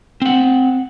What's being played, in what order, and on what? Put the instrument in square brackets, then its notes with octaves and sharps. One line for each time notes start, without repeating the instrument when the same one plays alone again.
[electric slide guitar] C4 F#5